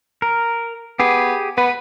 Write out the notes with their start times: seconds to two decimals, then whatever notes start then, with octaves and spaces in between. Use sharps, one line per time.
0.22 A#4
1.00 B3 G4 G#4
1.58 B3 B4